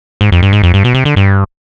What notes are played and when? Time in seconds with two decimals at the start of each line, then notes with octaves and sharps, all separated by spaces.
0.21 G#2
0.32 F2
0.43 G2
0.53 G#2
0.63 F2
0.74 G2
0.84 B2
0.94 C3
1.05 D3
1.16 G2